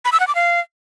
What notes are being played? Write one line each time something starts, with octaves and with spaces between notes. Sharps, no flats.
B5
E6
F#5
D6
F5